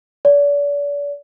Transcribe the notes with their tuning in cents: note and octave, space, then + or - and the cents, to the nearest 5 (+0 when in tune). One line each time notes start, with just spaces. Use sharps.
D5 -40